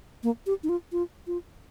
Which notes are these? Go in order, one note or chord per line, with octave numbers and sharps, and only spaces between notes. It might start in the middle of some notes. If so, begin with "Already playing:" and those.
A#3
G4
D#4
F4
F4
F4